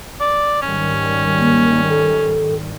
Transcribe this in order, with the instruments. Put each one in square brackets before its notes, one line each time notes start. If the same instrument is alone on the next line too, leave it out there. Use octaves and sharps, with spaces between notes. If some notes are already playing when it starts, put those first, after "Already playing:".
[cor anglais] D5
[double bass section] G#2 D#3 G3 [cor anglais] C#4
[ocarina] A#3
A4